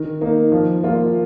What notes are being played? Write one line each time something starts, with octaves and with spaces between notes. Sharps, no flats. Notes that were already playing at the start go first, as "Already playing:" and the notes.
Already playing: D#3
A#3 D#4
F3
A#3 F4